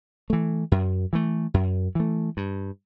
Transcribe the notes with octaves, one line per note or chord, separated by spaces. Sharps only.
E3 A3
F#2
E3 A3
F#2
E3 A3
G2